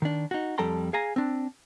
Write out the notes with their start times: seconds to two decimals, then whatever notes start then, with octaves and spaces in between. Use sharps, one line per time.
0.02 D#3 D4
0.31 D#4 F#4
0.58 F2 G3 A4 G5 A#5 C6
0.93 G#4 F5 G#5 A#5
1.16 C4 D4